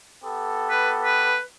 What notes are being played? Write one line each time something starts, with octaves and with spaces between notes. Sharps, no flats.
B3 G4 A4
B4
B4